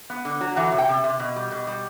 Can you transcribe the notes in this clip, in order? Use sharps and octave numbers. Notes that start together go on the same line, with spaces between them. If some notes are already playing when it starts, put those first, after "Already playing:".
B3
D3
F#3
E3 F#5
C3
G5
C3
C3
B2
G3
B2
G3